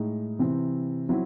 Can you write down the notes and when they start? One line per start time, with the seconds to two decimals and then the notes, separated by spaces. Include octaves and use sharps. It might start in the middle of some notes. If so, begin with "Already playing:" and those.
Already playing: A2 G#3 D#4
0.39 C3 E3 C4
1.09 F#3 C4 E4